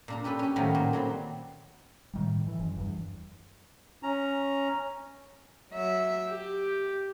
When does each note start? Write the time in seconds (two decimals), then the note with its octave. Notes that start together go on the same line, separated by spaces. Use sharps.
0.08 A#2 D4 A#5
0.24 C#4 G4 A4 B4
0.39 C#4 G4
0.56 A2 D#3 F3 F#3 A3 B3
0.75 A#2
0.93 F#3 G3 C4
2.14 A2 D#3 G3
2.47 E3
2.59 F#1
2.77 E2 G2
4.03 C#4 A#5
5.71 F#3 E5
6.28 G4